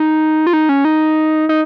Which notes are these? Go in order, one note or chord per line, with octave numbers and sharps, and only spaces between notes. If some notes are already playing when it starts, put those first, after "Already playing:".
Already playing: D#4
F4
D#4
C#4
D#4
D#4